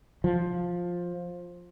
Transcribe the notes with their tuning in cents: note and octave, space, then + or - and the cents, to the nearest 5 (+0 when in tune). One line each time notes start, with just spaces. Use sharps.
F3 +10